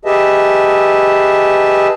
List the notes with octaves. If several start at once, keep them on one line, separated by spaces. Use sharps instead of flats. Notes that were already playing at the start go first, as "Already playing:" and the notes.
G4 G#4 B4 D#5 E5 A5